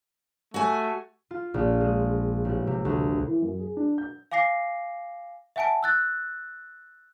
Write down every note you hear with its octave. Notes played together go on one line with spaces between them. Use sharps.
A3 F#4 G#5
F4
A#1
G#3
A1
C3
D2
E3
F#2
G#4
D4
G6
F5 G#5 D6 A#6 C7
E5 F#5 G#5 A5 D7
E6 F#6 A6